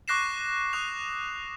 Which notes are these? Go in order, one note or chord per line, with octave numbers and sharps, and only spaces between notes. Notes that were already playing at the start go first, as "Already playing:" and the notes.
C#6 D6 F#6 A#6 C7 E7
C#6 D#6 F#6 F7